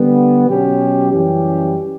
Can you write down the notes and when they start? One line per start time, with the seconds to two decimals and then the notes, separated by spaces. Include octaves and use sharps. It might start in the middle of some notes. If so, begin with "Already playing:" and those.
Already playing: D3 G3 B3
0.48 B2 F#3 C#4 G4
1.12 F#2 E3 G3 C#4 G4